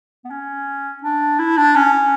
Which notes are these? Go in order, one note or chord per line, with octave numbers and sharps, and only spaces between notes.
B3
C#4
D4
E4
D4
C#4